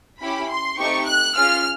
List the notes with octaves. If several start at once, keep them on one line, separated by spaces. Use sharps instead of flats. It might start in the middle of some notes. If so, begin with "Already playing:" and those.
C#4 E4 G4 B5
C6
A3 C4 D#4 G4 C#6
F#6
C#4 F4 G#4 F6